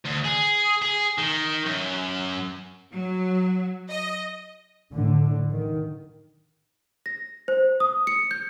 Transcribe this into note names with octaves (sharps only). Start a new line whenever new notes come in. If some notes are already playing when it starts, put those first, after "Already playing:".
D2
G#4
G#4
D#3
F#2
F#3
D#5
A2 D3
D#3
A#6
C5
D#6
C#7
G6